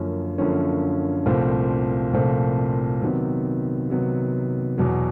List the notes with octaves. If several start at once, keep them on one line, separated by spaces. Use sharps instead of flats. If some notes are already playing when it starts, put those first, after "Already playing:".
Already playing: F#2 D3 F3 A#3 C#4
F#2 D3 F3 A#3 C#4
C2 A#2 F3 A3 C4
C2 A#2 F3 A3 C4
C3 D#3 F#3 B3
C3 D#3 F#3 B3
E2 B2 F#3